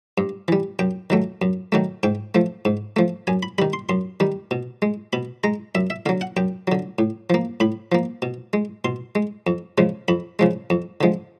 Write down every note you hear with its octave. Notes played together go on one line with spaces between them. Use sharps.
G2
E3 G3
F#2 G5
D#3 F#3 A3
F#2
D#3 F#3 A3
G#2 G5
F3 A3
G#2
F3 A3
F#2 G#5
B5
D#3 G3 B5
C6
F#2 C6
D#3 G3
B2
G#3
B2 B5
G#3 A#5
F#2 E5
E5
D3 F#3 F5
F#5
F#2 G5
D3 F#3
A2
F3 A#3
A2 B5
F3 A#3
B2
G#3
B2 C6
G#3
F2
C#3 F3 G#3
F2 B5
C#3 F3 G#3
F2
D3 F3 G#3